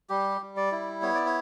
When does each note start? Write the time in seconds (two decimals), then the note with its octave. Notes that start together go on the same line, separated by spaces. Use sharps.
0.09 G3 G4
0.41 G3
0.57 D5
0.72 E4
1.02 B3 C#5
1.15 D5
1.26 C#5